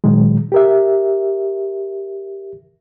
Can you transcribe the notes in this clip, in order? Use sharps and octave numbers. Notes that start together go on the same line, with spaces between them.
A#2 D#3 F#3 G#3
G4 A#4 E5